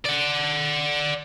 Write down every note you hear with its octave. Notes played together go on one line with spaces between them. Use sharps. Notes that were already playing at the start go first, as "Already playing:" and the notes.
D5 F#5